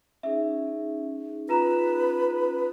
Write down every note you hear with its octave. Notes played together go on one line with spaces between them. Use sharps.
C#4 D#4 G#4 E5
F4 B4 A#5 E7